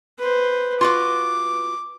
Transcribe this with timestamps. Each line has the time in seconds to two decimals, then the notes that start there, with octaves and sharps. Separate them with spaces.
0.19 B4 C5
0.81 F4 F#4 B4 D6